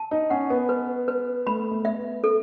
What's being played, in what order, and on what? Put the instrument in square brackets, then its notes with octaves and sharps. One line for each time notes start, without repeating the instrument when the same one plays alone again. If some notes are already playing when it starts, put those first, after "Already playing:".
Already playing: [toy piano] A5
[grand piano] D#4
[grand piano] C#4 [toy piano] F#5
[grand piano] B3
[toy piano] B4
B4
[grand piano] A3 [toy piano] B5
[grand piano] A3
B3
[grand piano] A3 [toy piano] E5
[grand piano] B3
[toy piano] A4